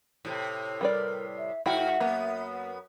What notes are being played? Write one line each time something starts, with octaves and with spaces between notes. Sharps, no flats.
A2 C3
G3 A#4 B4 D5
E5
G#2 E4 F#4 E5 G5
F#2 A#3 B3